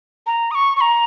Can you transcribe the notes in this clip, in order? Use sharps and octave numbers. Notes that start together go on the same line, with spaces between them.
A#5
D#6
C#6
C#6
A#5